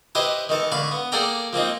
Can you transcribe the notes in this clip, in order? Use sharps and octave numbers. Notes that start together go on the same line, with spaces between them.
E4 G4 B4 C5 D#5
D#3 E3 A4
D3 F5 B5 C#6
B3
A#3 G#4 A4 D5 G5 A#5
F3 A#3 C4 D#4